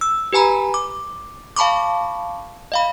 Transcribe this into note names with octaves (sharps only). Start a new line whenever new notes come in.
E6
G4 B4 G#5 A#5 B5
D6
F5 A5 B5 C#6 D6
D#5 F5 B5